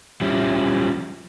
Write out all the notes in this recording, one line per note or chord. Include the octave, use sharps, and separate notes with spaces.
F3 G3 C#4 E4